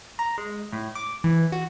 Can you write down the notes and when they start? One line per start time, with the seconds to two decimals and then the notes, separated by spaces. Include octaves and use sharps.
0.19 A#5
0.38 G#3
0.73 A2
0.95 D6
1.24 E3
1.52 F#4